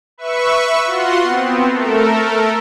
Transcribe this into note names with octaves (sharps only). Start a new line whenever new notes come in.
B4 E5 C#6
F4 F#4 F#5 C6
B3 C4
A3 A4 A#4